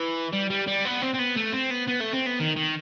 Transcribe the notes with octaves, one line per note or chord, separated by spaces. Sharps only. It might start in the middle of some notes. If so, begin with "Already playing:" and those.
Already playing: E3
G3
G3
G3
B3
C4
C4
B3
A3
C4
B3
B3
A3
C4
B3
D#3
D#3